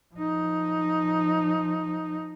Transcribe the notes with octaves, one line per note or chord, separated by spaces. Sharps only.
F3 D#4